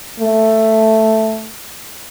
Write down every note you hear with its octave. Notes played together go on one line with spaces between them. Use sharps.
A3